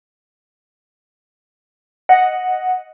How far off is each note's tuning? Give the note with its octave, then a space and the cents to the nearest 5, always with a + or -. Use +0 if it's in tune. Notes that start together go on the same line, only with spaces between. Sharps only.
D#5 +0 F#5 +0